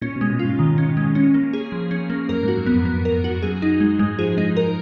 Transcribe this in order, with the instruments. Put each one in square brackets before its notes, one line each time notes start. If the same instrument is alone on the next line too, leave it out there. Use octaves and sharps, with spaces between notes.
[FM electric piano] A#2 [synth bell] C#4
[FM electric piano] B2
[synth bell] G#3
[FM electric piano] A#2
[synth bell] F4
[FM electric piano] G#2
[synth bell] D#3
C#4
G#3
C#4
A#3
G#4
F3
C#4
A#3
[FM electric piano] F#2 [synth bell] A#4
[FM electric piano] G#2
[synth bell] F#4
[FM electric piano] F#2
[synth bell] B3
[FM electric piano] F2
[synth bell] B3
A#4
F#4
[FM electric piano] F#2 [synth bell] G#4
[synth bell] D#4
G#3
[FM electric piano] G#2 [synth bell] G#3
[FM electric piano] F3 [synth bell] G#4
[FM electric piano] G#3 [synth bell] D#4
[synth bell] A#4